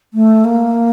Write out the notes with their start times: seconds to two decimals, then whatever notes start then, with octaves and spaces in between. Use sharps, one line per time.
0.14 A3
0.44 A#3